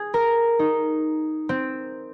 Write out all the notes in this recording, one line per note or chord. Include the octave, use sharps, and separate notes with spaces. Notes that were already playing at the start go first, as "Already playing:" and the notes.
Already playing: G#4
A#4
D#4
C4